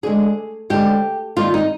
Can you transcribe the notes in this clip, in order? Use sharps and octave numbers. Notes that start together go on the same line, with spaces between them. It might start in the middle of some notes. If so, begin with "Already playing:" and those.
D2 D3 G#3 G#4
D2 D3 G#3 G4
D#2 D#3 G3 A#3 F4
D#4